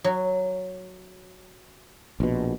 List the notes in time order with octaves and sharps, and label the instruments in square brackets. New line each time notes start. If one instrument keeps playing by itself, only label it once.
[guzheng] F#3
[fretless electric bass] A#1 B2